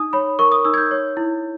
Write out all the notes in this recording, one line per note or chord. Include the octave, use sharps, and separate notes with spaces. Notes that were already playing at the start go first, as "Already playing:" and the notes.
Already playing: D#4 D#6
C#5 B5
A#4 C#6
D#6
D#4 E6
G#6
G6
C#5
E4